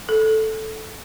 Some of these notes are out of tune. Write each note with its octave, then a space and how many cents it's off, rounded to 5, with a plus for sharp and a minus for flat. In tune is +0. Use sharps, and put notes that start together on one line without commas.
A4 -5